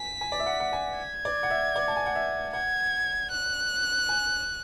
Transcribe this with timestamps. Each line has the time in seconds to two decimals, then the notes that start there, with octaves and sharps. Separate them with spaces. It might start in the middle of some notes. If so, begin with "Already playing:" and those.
Already playing: G#5 B6
0.21 G#5
0.32 D5
0.39 E5
0.46 F#5
0.60 F#5
0.73 G#5
0.99 G#6
1.25 D5
1.43 F#5
1.50 E5
1.76 D5
1.88 A5
1.96 G#5
2.06 F#5
2.15 E5
2.53 F#5 G#6
3.31 F#6
4.09 G#5